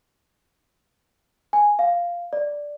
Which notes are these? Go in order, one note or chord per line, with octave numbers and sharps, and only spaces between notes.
G#5
F5
D5